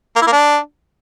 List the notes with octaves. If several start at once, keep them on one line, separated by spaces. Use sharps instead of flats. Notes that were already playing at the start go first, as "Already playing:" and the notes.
A#3
E4
A#3
D4